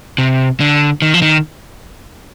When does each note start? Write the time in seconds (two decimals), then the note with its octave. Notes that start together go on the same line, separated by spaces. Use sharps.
0.18 C3
0.60 D3
1.02 D#3
1.14 F3
1.22 D#3